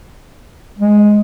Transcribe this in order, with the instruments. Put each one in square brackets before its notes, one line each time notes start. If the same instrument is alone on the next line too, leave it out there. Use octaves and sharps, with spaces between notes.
[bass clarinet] G#3